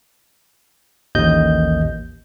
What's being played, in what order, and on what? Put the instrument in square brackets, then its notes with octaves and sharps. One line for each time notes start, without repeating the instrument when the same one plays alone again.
[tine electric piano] A1 D#2 D#5 G6